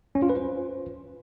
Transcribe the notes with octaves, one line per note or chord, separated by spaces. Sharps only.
C#4
F4
B4
C5